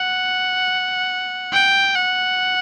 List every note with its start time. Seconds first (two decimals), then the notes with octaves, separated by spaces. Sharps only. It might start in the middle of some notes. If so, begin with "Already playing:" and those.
Already playing: F#5
1.53 G5
1.95 F#5